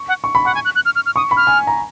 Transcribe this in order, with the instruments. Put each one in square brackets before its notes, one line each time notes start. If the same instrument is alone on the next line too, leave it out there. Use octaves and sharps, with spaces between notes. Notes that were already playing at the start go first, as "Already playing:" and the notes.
Already playing: [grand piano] C#6
[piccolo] F#5
[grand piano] C#6
B5
[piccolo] F#5 [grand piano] C#6
[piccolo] G#5
F#6
F#6
F6
F6
F6
[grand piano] C#6 [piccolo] D#6
[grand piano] B5
[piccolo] F6
[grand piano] G#5
A#5